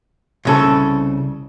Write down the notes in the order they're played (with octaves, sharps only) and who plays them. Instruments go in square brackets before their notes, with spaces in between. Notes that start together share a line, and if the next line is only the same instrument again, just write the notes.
[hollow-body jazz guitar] C2 C#3 A4